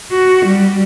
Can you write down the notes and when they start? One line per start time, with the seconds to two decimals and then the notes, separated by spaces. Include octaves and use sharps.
0.12 F#4
0.46 G3